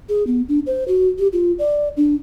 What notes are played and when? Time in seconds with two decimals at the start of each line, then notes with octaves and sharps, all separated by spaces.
0.09 G#4
0.27 B3
0.49 D4
0.66 C5
0.88 F#4
1.19 G4
1.33 F4
1.59 D5
1.97 D4